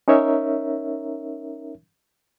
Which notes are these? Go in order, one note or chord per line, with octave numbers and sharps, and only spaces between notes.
C#4 D#4 A#4 C#5 E5